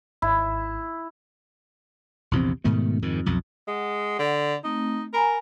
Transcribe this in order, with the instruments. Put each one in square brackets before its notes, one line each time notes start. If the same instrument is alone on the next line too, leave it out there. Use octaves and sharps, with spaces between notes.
[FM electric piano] G#1 [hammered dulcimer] E4
[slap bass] A#1 E2 C3 C4
G#2 B2 D#3 A3
F2 G#2 D#3
B1 F2
[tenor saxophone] G#3 [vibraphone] F#5
[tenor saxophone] D3
[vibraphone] A3 C4 [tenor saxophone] D#4
[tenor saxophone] A#4 [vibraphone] G#5 A#5 B5